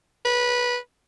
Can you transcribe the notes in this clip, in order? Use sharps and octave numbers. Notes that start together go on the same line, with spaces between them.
B4